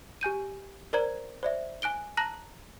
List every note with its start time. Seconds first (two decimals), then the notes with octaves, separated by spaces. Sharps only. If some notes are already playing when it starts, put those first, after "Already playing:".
0.21 G4 G#5 G6 D#7
0.93 A#4 C5 D5 A#5 G#6
1.43 C5 D5 E5
1.82 G#5 F#6 D7 G7
2.17 A5 A#5 F#6 A#6 F#7